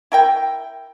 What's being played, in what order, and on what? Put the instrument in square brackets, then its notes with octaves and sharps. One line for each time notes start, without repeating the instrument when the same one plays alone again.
[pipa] E4 A#4 G5